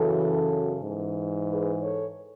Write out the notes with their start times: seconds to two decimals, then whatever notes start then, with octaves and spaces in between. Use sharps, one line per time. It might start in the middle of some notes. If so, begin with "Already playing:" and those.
Already playing: F#2 C#3 E3 F#4 A4
0.81 G#2 E3
1.47 G#4 B4
1.81 A4 C#5